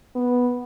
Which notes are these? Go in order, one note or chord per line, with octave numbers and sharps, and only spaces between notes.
B3